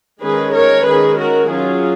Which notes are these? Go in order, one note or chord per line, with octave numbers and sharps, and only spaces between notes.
D#3 G#3 C#4 G#4 B4
A#4 C#5
D#3 G#3 C#4 G#4 B4
F#4 A#4
F#3 C#4 F4 G#4